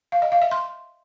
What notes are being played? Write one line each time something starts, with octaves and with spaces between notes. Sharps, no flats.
F5
D#5
F5
E5
C6